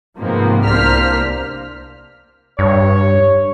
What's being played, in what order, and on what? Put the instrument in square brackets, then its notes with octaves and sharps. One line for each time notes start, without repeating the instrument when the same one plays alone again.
[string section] G#2 C3 F3 A#3 B3
C2 A#3 D4 C5 F6 B6
[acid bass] G2 [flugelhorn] C#5